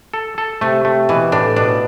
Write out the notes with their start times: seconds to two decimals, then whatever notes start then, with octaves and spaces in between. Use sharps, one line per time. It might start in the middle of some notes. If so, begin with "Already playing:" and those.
0.14 A4
0.38 A4
0.61 C3 A3
0.85 A3
1.09 B2 E3
1.32 A2 D4
1.56 B2 D4